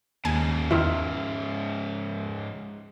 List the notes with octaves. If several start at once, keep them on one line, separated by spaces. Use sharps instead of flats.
D#2 G#2 C#3 G#5
E2 D#3 E4 E5 C6 F6